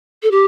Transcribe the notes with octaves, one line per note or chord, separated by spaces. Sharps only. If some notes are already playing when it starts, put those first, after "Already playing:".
A4
G4